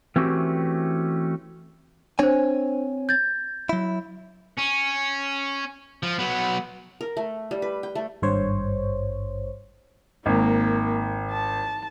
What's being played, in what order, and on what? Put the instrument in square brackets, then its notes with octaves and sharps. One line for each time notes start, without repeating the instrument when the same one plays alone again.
[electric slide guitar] E3 A3 C4 C#4 F#4 G4
[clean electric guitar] C4 C#5 G#5 [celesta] D4 C5
[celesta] G6 A6
[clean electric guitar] F#3 E4
[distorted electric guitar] C#4
F3
F#3 B3
[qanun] A#4
A3
G3
B4
G5
A3
[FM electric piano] G#1 G2 C5 C#5
[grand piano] G#1 [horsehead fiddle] A#3
[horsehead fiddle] A5